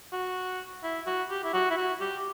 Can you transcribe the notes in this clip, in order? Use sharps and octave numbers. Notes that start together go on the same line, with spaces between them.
F#4
E4
F#4
G4
E4
F#4
E4
F#4
G4